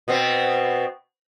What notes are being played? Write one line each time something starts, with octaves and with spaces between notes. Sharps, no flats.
B2 B3 C4